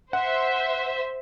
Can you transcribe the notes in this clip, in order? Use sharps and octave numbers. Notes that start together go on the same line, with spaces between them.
C5 E5 F#5